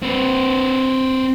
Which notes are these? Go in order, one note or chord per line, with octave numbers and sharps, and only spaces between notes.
C4 B4